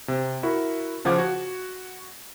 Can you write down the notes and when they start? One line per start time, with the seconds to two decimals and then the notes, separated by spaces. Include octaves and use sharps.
0.08 C3
0.43 E4 F#4 A#4
1.05 C#3 F3 F5 F#5 D6 G#6
1.18 F#4